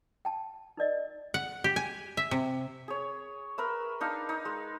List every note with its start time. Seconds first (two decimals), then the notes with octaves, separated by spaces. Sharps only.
0.25 G5 A5
0.77 D#4 A#4 D5 D#5
1.34 F#5
1.64 G4
1.76 G#5
2.17 E5
2.31 C3
2.88 G#4 C#5
3.58 A#4 B4 E5
4.01 D4 D#4 F5
4.29 D#4
4.45 G#3